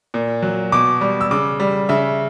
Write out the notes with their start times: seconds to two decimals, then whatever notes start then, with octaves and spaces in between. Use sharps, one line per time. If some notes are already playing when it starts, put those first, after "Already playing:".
0.14 A#2
0.42 F#3
0.72 B2 D6
1.01 G3
1.21 E6
1.31 C#3 D6
1.60 G3
1.89 C#3 E5